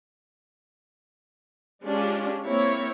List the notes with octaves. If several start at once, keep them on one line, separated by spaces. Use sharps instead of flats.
G#3 C#4 D4 F4 G4
A#3 C4 E4 C#5